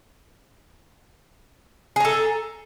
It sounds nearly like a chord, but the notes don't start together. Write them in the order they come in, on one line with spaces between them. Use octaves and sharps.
G#4 A#5 A4